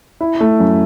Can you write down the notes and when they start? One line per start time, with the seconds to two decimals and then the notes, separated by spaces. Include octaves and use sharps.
0.21 E4
0.41 A3
0.60 F#2